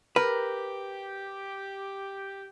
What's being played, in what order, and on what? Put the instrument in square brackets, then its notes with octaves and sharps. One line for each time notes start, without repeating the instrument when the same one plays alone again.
[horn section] G4 [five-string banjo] A#4 [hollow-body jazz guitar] B4